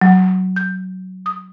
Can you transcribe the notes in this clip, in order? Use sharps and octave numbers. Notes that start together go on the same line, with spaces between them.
F#3
G6
D#6